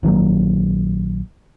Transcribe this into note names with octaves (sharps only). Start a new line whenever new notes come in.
A#1 D#3 F#3 A#3